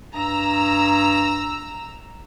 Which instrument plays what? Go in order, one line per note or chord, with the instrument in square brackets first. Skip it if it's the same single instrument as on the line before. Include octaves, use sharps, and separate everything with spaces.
[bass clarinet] G2 [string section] A#5 E6